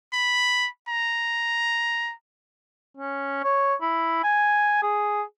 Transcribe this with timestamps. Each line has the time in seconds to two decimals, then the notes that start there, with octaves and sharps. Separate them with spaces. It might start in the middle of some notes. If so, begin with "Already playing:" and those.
0.14 B5
0.89 A#5
2.97 C#4
3.44 C#5
3.82 E4
4.24 G#5
4.82 G#4